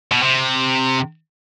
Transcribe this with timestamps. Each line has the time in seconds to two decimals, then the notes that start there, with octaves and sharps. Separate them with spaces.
0.12 B2
0.23 C3